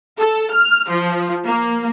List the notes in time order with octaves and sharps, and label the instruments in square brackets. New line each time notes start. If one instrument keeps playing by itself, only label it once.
[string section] A4
F6
F3
A#3